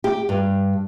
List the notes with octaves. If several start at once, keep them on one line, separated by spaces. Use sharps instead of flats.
G4
G2